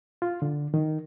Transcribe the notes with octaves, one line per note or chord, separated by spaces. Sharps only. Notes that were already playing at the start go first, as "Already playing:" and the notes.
F4
D3
D#3